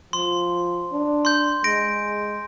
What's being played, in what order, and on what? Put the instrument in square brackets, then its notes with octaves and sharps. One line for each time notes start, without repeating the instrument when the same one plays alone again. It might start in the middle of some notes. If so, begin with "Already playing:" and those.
[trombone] F3 [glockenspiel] C6
[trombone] D4
[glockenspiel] C6 G6
[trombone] G#3 [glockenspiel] A#6 D7